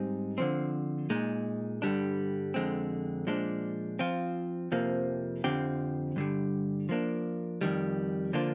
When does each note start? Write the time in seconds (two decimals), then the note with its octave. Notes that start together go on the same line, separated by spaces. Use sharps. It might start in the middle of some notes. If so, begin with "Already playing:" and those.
Already playing: G#2 G3 C4 D#4
0.38 D3 F3 C4
1.10 A#2 G#3 D#4
1.82 G2 D3 G3 D4
2.54 F2 D3 G#3 C4
3.27 A#2 F3 G#3 D4
3.99 F3 C4 F4
4.72 F2 C3 F3 A#3
5.44 F2 D3 F3 C4 G4
6.16 G2 D3 G3
6.89 F3 A#3 D4
7.61 F2 D#3 G3
8.33 D3 F3 A#3 D4 F4